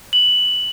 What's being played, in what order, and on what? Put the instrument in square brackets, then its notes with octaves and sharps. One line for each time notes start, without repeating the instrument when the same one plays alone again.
[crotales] F#7